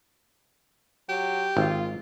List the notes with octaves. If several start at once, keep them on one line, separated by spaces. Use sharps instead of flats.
F#3 G4
G#1 F4